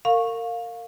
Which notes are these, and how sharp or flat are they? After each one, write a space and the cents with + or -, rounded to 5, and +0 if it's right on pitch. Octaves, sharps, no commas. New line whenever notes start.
A#4 -30 F5 +15 C#6 -10